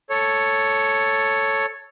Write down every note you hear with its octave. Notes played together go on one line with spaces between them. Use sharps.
A4 C#5